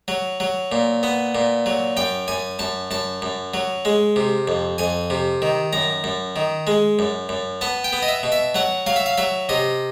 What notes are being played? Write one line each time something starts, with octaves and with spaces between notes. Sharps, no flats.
F#3
F#3
A#2
B3
A#2
F#3
F#2 G5
F#2 G#5
F#2 A5
F#2 A5
F#2
F#3
G#3
C3
F2
F2 G#5
C3
D#3
F#2 A#5
F#2
D#3
G#3
F#2
F#2
B3 A5
G5
B3
D#5
E5
B2
E5
F#3 F#5
F#3 F5
E5
F5
F#3 E5
C3 D#5